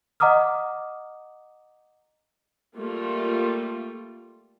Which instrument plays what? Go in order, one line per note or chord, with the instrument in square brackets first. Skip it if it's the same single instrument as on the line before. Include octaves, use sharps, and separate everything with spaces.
[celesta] D#5 F#5 A#5 D6 D#6 F6
[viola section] G3 A3 A#3 F4